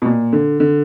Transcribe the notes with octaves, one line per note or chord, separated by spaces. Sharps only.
B2
A#2
D3
D3